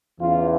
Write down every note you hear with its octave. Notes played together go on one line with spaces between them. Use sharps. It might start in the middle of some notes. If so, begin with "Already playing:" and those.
E2 C#3 E3 F4